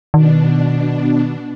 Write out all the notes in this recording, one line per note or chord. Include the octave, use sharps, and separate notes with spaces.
B2 D#3 D4